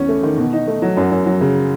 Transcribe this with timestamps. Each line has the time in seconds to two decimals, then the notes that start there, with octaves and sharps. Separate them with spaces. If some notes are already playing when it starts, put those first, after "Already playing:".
Already playing: E2 C#4
0.09 A3
0.23 D#3
0.38 B2
0.53 D#4
0.67 A3
0.82 F#3
0.97 F#2
1.12 F#2
1.26 F#3
1.41 C#3